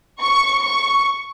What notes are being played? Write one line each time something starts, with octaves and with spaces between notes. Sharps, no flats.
C#6
C#6